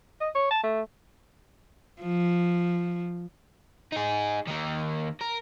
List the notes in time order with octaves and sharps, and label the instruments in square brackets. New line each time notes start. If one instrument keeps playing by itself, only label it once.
[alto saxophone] D#5
C#5
A5
A3
[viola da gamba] F3
[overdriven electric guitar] D#4 G#4
D#3 A#3
A#4